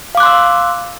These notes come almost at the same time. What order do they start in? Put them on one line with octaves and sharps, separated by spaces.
F5 D6 F#6 C6 E6